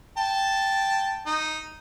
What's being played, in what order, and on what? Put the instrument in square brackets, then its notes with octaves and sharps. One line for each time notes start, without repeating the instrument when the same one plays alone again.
[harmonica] G5 A5
D#4